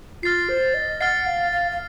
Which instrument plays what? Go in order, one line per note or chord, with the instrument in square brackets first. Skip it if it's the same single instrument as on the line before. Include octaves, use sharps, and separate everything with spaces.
[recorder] F4 [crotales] F6 A6 C7
[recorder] C5
D#5
[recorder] F#5 [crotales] F6 A6 C7
[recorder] F5
F5
F5